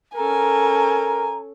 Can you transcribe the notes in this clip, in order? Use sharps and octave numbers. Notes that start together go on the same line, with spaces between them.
C#4 A4 A#4 G#5 A#5